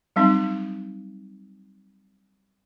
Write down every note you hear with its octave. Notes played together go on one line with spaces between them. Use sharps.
F#3 G3 C4 D#4